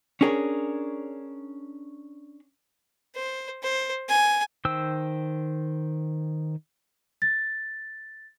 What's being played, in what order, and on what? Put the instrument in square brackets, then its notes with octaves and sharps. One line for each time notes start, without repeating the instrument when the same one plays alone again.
[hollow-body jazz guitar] C#4 D4 G#4 A#4 C#5
[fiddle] C5
C5
G#5
[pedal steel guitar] D#3 C5 G5 E6
[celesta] A6